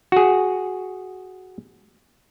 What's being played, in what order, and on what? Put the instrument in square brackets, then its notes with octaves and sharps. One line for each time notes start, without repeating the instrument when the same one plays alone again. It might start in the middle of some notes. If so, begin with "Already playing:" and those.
[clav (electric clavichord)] F#4 G#4